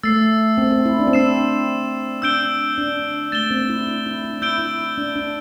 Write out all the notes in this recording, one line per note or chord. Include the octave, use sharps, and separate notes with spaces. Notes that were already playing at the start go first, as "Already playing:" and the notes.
A3 E6 A6 C7
C4
C4
E4
D4
C4
D4 E6 C7 E7
D4 E6 G6 D7 G7
D4
A3 A6 E7 G7
C4
E4
D4
E4
D4
E4 E6 G6 D7 G7
E4
D4
D4